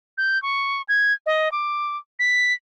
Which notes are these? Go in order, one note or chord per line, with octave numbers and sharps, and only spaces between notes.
G6
C#6
G#6
D#5
D6
B6